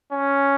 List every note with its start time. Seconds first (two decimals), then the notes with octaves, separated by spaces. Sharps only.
0.12 C#4